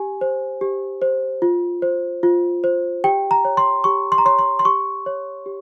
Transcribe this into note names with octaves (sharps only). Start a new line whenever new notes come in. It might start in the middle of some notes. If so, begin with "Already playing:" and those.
Already playing: G4 G#5
C5
G4
C5
F4
C5
F4
C5
G4 G5
A#5
C#5
C6
G4 C#6
C6
A#5
C#5 C6
C6
C6
G4 C#6
C#5
G4